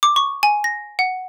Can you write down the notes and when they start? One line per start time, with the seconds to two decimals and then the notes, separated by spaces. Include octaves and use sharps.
0.03 D6
0.16 C#6
0.43 G#5
0.64 A#6
0.99 F#5